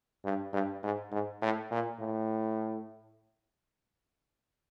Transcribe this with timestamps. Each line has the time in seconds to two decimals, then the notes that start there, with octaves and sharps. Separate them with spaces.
0.25 G2
0.53 G2
0.83 G#2
1.12 G#2
1.42 A2
1.71 A#2
2.00 A2